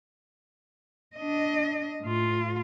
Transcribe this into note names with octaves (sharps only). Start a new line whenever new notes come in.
D4 D#5
A2 F4